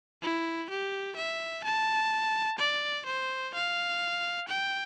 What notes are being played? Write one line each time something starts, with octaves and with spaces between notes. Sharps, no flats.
E4
G4
E5
A5
D5
C5
F5
G5